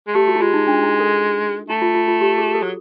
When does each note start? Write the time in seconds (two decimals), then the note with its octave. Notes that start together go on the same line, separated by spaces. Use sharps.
0.07 G#3
0.15 A3 G4
0.28 F#4
0.36 E4
0.40 G#3 F4
0.54 D#4
0.67 D4
0.83 E4
1.00 A4
1.69 A3 E4
1.82 F4
1.95 F4
2.08 F4
2.21 G4
2.38 G#4
2.55 A4
2.62 F#3